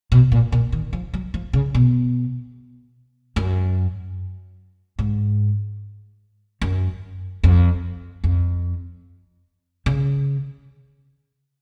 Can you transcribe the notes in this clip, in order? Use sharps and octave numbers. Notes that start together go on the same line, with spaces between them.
B2
A#2
A#2
D#3
F3
F#3
F3
C#3
B2
F#2
G#2
F#2
F2
F2
C#3